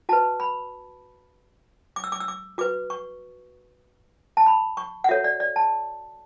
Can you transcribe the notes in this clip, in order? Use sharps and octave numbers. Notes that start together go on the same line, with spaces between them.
F#4 B4 A5
B5
D6
E6
D6
E6
D6
F#4 B4 D6
C#6
A5
B5
C#6
F#5
F#4 A4 C#5 E5
D5
D5
A5